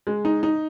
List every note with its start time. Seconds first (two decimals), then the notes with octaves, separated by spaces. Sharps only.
0.07 G#3
0.25 D#4
0.43 D#4